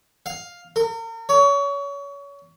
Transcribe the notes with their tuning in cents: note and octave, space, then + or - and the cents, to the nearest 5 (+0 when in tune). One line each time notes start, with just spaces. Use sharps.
F5 +5
A#4 -40
C#5 +30